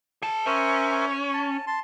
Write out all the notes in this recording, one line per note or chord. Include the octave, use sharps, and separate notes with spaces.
G#4 A5
C#4 A#4 C5 E5
A5
A5 C6